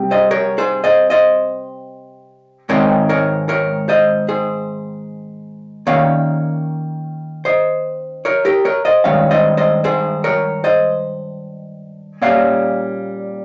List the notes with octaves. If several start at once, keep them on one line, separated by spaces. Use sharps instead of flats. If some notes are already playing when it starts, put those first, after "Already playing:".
Already playing: C3 G3 C4
C5 D#5
A#4 C#5
G#4 C5
C5 D#5
C5 D#5
G#2 D#3 G#3 C4 D#4 A#4 C#5
A#4 C#5
A#4 C#5
C5 D#5
G#4 C5
D#3 A#3 C#4 C#5 F5
C5 D#5
A#4 C#5
G4 A#4
A#4 C#5
C5 D#5
G2 D#3 G#3 C#4 C#5 F5
C5 D#5
C5 D#5
G#4 C5
A#4 C#5
C5 D#5
A#2 G3 A#3 C#4 C#5 F5